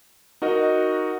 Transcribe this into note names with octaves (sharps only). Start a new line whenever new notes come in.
D#4 F#4 A#4 D#5